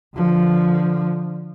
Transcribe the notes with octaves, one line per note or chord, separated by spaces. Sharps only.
D3 F3